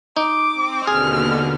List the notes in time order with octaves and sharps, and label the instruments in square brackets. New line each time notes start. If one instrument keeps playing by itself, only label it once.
[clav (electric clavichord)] D#4 [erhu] D6
[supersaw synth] C4
[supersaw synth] D#2 B2 D3 [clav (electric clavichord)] G#4 [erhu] F6